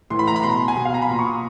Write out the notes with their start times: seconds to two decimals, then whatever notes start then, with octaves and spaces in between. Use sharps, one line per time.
0.10 A2 E3 C6
0.19 B5
0.27 A#5
0.36 B5
0.43 B2 C6
0.68 G#5
0.76 B2
0.85 F5
0.94 A#5
1.02 B5
1.10 A#2 C6
1.19 C#6
1.27 D#6